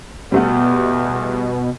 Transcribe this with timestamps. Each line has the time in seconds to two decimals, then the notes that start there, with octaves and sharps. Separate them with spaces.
0.32 E2 B2 G3 A3 B3